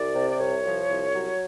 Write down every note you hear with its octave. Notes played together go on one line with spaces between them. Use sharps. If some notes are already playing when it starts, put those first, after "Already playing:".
Already playing: C2 D5
C3
D5
C2 C#5
F3
C2
F#3